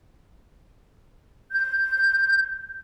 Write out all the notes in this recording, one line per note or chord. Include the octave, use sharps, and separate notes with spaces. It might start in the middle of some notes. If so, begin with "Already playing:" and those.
G6